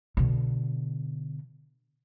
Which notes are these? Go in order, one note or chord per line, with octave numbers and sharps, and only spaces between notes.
B2 D3